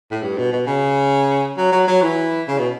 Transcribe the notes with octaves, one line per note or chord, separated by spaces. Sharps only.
A2
G2
B2
B2
C#3
F#3
F#3
F#3
E3
C#3
B2